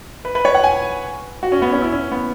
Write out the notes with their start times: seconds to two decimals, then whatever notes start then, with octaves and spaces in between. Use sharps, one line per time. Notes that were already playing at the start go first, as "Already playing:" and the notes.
0.25 B4
0.35 B4
0.45 C#5
0.55 F#5
0.64 G#5
1.43 F#4
1.52 C#4
1.62 B3
1.72 C#4
1.81 E4
1.93 C#4
2.12 B3